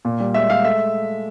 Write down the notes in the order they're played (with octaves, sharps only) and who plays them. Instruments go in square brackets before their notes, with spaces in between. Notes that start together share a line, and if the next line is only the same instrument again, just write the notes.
[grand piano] A#2
G3
G#3 E5
G#3 F5
A3 E5